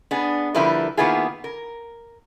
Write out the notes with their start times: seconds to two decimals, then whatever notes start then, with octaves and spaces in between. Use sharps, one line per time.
0.11 B3 D4 G#4
0.55 D3 F3 G3 E4 A#4 B4
0.97 D#3 A#3 B3 E4 F4 G#4
1.44 A#4